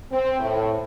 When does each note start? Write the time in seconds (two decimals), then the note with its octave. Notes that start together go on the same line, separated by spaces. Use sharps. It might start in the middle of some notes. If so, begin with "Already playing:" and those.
0.12 C4
0.40 A2